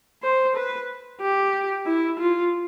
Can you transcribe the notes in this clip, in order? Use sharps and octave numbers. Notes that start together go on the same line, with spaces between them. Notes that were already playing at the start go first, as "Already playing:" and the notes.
C5
B4
G4
E4
F4